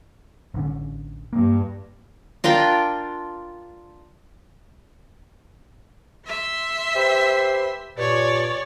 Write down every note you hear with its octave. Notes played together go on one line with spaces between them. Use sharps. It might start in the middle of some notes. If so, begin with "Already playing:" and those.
A1 D3 C#4
G2 A#3
D4 F4 A#4 G5
E5 C6
G4 B4 C5
G2 A#2 C#5 D5